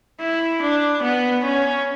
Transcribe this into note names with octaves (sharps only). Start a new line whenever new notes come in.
E4
D4
B3
C#4